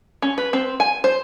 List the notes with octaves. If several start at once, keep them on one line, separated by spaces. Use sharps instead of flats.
C#4
B4
C4
G#5
C5